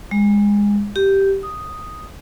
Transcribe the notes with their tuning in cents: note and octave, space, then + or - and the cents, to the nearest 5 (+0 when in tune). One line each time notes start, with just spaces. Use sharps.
G#3 -20
G4 -5
D#6 +0